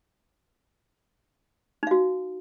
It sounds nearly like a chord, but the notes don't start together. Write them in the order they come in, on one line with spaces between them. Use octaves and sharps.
D#4 F5 F#4